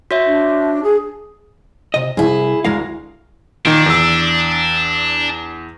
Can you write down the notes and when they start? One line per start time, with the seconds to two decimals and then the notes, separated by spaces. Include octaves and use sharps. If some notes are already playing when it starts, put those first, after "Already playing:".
0.11 F#4 C#5 E5
0.26 D4
0.83 G#4
1.94 C3 D#5
2.17 C2 E4 G#4
2.64 D2 G#3 A#4 F5
3.65 A#2 D#3 D4
3.86 E2 E6